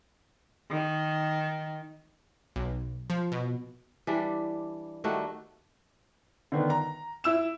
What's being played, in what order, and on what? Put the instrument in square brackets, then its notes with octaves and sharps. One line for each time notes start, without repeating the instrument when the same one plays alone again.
[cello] D#3
[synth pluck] B1
F3
B2
[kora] E3 G3 D4
D#3 G3 A3 F#4
[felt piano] D3 D#3 B3
A#5
E4 E6 E7